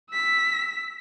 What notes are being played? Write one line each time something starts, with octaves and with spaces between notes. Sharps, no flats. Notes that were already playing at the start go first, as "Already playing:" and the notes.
E6 B6